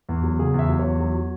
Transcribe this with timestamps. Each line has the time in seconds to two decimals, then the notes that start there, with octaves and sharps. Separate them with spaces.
0.09 E2
0.23 F#3
0.39 C#3 G#4
0.54 E2 E5
0.69 F#3
0.79 C#5
0.84 E2
0.99 F#3
1.15 F#3